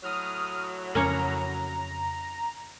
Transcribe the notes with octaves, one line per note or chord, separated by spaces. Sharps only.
A2 F#3 D#6 F6
F2 C#3 A#3 C#4 C#5 A#5